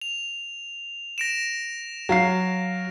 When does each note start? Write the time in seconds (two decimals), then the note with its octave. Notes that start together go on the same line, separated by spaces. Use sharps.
0.02 F7
1.18 A#6 D7 E7
2.09 F#3 F5 C7